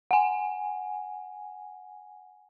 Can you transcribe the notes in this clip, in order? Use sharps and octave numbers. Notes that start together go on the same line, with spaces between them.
F#5 G#5